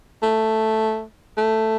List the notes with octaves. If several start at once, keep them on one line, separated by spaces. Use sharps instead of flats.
A3
A3